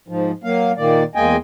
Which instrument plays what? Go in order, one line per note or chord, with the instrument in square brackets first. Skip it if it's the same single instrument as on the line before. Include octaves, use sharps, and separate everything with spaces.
[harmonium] G#2 F3
F#3 A#3 F5
A#2 D#3 A#3 D5
E2 G#3 A#3 D#5 G5 G#5